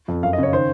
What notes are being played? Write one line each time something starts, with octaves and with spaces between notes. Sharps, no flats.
F2
F#2 F5
D#5
C#3 C#5
D#3 C5